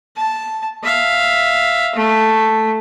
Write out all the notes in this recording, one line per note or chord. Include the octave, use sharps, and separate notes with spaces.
A5
E5 F5
A3